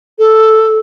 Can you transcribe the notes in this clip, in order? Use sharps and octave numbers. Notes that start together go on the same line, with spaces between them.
A4